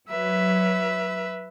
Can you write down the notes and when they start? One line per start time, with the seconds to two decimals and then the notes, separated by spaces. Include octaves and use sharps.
0.10 F#3 B4 E5